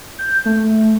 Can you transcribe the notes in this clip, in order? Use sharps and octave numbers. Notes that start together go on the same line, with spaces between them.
G6
A3